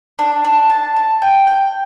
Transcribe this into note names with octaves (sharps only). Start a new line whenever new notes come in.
D4
D4
A5
A5
G5
G5